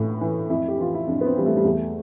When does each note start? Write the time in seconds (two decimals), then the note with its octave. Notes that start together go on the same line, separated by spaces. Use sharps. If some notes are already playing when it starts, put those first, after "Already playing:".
Already playing: A2 E3
0.21 E3
0.50 F2 E4
0.68 G4
0.78 E3 F4
0.94 E4
1.07 F2 D4
1.21 B3
1.26 C4
1.36 E3 G3
1.46 A3
1.57 G3
1.64 E2 A3